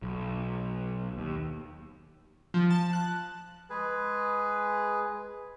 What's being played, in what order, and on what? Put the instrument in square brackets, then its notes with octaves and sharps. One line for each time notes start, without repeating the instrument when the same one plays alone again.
[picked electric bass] B1
D#2
[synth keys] F3
A5
F#6
[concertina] G#3 G#4 B4